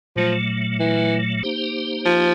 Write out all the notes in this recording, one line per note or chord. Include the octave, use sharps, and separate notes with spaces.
A#2 F3 F#3 A3
E3
A#3 D#4 G4 C5
F3